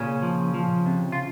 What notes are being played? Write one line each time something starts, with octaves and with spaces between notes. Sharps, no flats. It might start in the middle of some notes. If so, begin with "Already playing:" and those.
Already playing: A#2 C#3 C#4
F3
F3
C3
F4